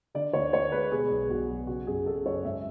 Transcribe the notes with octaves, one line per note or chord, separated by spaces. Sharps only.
D3 D5
D2 C#5
D2 C#5
G#3 B4
B2 G#4
B1
B1 F#4
F#3
C#3 F#4
F#2 G#4
F#2 A4
F#3 C#5
G#2 E5